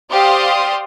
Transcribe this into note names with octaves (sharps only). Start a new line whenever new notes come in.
G4 C5 D5 F5 C6 D#6